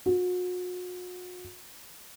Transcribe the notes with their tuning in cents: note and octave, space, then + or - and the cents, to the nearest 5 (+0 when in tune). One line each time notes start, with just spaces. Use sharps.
F#4 -40